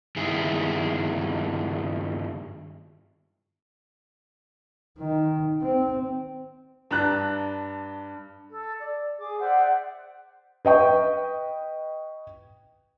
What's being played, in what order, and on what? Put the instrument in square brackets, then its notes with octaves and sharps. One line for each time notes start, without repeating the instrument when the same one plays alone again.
[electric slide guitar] G2 D#3 E4 G#4
[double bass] D#3
C4
[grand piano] G2 D4 A#5 F#6
[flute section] A4
D5
G#4 D6
C5 D5 E5 F#5
[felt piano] B4 D#5 G5 C#6